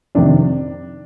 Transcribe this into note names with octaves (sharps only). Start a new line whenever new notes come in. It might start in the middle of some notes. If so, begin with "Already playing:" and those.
F2 C3 D#3 D4